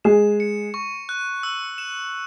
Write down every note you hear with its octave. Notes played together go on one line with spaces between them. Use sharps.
G#3 G#4 E7
C#7
C#6
F#6
E6
E7